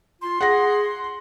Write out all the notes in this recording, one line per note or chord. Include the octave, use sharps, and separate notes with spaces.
F4 C6
G#4 F#5 A#6